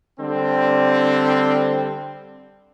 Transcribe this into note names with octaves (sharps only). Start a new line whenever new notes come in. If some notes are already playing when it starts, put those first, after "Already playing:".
D3 G3 C4